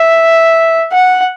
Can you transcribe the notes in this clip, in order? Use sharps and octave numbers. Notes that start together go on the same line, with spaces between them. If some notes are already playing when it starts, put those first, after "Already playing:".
Already playing: E5
F#5